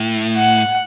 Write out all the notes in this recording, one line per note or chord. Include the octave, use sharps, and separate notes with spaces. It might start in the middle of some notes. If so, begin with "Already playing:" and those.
Already playing: A2
F#5